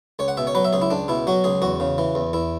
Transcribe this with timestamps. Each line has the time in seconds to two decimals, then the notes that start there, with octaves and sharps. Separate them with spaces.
0.19 C#2 C#5
0.28 F#5
0.37 B2 E5
0.47 C#5
0.55 F#3 B4
0.65 E5
0.73 C#2 G#4
0.82 E4
0.90 C#2 D4
1.08 B2 E4
1.27 F#3 F#4
1.44 C#2 G#4
1.62 E2 F#4
1.80 C#3
1.98 E3
2.15 E2
2.33 E2 E4